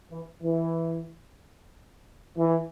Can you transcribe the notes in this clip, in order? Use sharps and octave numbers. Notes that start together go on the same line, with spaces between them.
E3
E3
E3